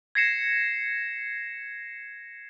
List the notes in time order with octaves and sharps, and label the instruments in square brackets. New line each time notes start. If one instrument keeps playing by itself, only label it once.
[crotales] G#6 A#6 C7 C#7 E7